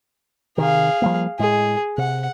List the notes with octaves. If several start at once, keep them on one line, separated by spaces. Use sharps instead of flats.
C3 D#3 G#4 F5
F3 G3 A#3
A2 G#3 G#4
C3 F#5